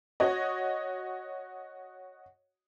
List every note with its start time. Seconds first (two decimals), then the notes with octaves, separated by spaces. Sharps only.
0.20 F#4 C#5 D#5